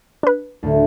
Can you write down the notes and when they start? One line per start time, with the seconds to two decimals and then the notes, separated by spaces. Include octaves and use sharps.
0.23 D4 B4
0.63 D2 A2 D3